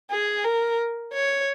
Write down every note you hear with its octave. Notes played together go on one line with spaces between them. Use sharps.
G#4
A#4
C#5